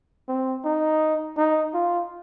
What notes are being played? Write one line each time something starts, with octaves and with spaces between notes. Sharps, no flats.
C4
D#4
D#4
F4